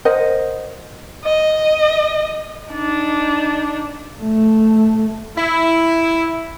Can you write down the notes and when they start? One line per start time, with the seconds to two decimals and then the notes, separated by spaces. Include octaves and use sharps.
0.05 A#4 C5 D#5 F#5
1.24 D#5
2.72 D4 D#4
4.21 A3
5.38 E4